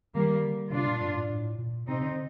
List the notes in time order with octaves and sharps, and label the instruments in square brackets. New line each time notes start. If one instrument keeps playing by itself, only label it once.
[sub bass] D#3 [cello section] G3 A#3
[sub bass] D3
[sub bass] C3 [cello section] D4 F4
[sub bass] A#2
G2
A2
A2
A#2
[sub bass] C3 [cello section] C4 D#4
[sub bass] D3